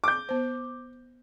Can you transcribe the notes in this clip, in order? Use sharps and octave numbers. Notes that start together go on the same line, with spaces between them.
D6 G6
B3 C5